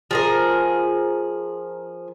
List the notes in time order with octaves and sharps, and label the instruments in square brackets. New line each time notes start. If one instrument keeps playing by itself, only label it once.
[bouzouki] F3 G#4 A#4